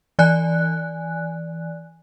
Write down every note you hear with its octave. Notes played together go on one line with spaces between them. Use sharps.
E3 D5 G#5 F#6